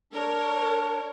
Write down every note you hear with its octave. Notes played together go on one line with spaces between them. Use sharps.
D4 A#4 C#5